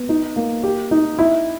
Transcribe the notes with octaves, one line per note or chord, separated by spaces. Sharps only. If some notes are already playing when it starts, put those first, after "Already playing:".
Already playing: B3
D#4
A#3
G4
D#4
E4